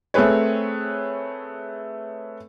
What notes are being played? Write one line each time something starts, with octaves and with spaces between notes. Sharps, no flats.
A3 C4 G#4 B4 C#5